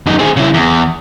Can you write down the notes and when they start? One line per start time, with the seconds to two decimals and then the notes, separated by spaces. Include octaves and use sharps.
0.06 F#2 D#4
0.19 C4 G#4
0.37 C#3 E4
0.54 E2